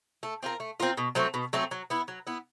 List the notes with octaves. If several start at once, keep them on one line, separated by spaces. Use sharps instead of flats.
A3
C4 F4 A#4
A3
C4 F4 A#4
B2
F#3 A3 C4
B2
F#3 A3 C4
F#3
B3 E4
F#3
B3 E4